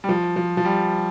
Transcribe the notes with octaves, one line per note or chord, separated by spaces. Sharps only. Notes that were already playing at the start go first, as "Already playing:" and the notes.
G3
F3
F3
F3
G3